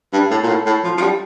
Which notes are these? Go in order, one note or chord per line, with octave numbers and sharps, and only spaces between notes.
G2
A2
A#2
A2
A2
F3
F3
G3